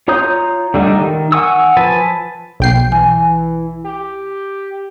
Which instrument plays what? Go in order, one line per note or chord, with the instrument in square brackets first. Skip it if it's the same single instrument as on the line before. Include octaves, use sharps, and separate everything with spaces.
[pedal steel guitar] F4 C#5 A#5 D#6 G6
D3 G3 A3 D#4
D#3
F#5 G#5 C#6 D#6 E6
F3 B4 G#5 A5
[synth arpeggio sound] B1 G5 C7
[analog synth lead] E3 [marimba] G#5
[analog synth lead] G4